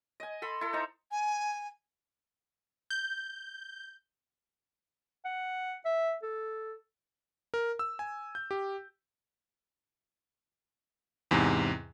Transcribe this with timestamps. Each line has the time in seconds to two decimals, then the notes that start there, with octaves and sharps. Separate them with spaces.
0.20 D#5 G#5
0.42 A4 B5 C6
0.61 E4 A4
0.73 D#4 C5 A#5
1.11 G#5
2.90 G6
5.25 F#5
5.85 E5
6.23 A4
7.54 A#4
7.79 E6
7.99 G#5
8.35 G6
8.51 G4
11.31 E2 G#2 C3